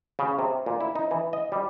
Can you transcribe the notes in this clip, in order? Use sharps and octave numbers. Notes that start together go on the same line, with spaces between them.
C#3
C3
A#2
E4
D#4
E3
D#5
G3